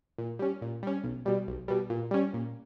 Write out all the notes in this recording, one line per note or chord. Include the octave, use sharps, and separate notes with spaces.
A#2
G3 C#4
A#2
G3 C#4
B1
B2 G3
B1
B2 G3
A#2
G3 C#4
A#2